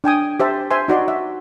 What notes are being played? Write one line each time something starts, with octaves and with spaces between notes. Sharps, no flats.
D4 G5 G#5 D#6
G4 C5 E5 A5
C5 E5 G#5 C6
D#4 F#4 D5 C6
E5